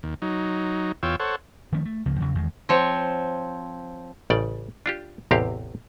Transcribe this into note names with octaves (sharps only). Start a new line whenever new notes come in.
D#2
F#3 D#4
E2 F4 C#5 G5 E6
A4 C5 C#5 F#5
D#3 F3 A3 C#4
A3
C#2 C#3 F3 A#3
E2 C#3 E3 F#3
E2 D#3 G#3
F3 C4 C#5
A1 C#3 D5 G5
D4 F4 G4
A1 E2 C3 C4 G4 F5